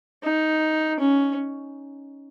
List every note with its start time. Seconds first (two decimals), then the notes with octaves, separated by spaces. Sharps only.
0.23 D#4
1.00 C#4